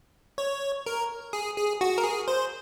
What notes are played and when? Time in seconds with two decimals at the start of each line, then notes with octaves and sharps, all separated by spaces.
0.38 C#5
0.86 A#4
1.33 G#4
1.57 G#4
1.81 F#4
1.98 A#4
2.04 G#4
2.28 C5